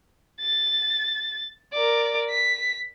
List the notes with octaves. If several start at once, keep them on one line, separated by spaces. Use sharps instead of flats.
A6
A#4 D5
B6